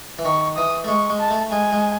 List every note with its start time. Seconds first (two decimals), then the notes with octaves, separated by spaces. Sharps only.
0.19 E3
0.25 D#3 C#6
0.57 E3 D#6
0.84 A3
0.88 G#3 C#6
1.10 G#3
1.20 A5
1.30 A3
1.51 G#3 G#5
1.73 G#3